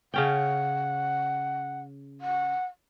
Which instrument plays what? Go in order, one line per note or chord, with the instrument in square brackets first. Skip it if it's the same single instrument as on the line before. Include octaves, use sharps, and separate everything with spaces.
[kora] C#3 C#4 G5 [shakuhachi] F#5
[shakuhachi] F#5